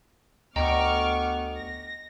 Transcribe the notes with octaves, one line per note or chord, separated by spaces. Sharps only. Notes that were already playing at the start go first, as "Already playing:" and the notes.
D2 B3 D#5 G5 A#5 C#6 D6 F6
A#6